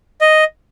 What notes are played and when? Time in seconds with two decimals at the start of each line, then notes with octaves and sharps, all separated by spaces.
0.21 D#5